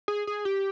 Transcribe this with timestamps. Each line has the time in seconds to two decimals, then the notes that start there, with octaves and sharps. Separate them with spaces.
0.08 G#4
0.27 G#4
0.45 G4